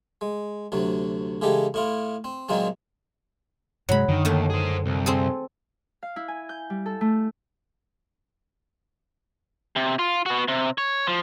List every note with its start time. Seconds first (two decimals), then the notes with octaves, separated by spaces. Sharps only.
0.21 G#3
0.72 D2 C3 F#3
1.42 C#3 E3 G#3 G4 A4
1.74 A2 E4 F4
2.24 C4
2.49 A#2 D#3 F#3 G#3 A#3 C4
3.89 G2 C3 F#3 G#3 B5
4.09 F#2 D3 D#3
4.25 D#2 D#3 A3
4.50 G#4 C5
4.86 C2
5.06 C4 G#4 A4
6.03 F5
6.16 E4
6.28 G#5
6.49 G6
6.70 G3
6.86 A4
7.01 A3
9.76 C3
9.99 F4
10.26 B3 F#4
10.48 C3
10.78 C#5
11.07 F3